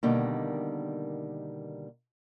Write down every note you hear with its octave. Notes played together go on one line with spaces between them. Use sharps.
B2 D3 D#3 G3 A#3